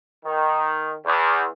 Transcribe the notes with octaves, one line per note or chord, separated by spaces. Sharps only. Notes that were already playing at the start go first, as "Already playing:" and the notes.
D#3
E2